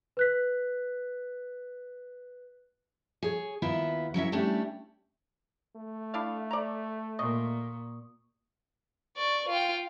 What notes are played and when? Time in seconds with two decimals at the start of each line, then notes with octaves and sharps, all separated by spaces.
0.17 B4 F#6 B6
3.22 G#4 C#5
3.62 D#2 B3 E4 F4 E5
4.14 F#3 C#4 E4 E5
4.32 G3 A3 C#4 D4 E4 G4
5.76 A3
6.14 D4 E4 F5
6.51 D5 A#5
7.19 A#2 D#5 C#6 D#6
9.17 D5 C#6
9.48 F4 G5